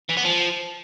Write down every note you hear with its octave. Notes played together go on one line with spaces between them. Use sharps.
E3
B3
F3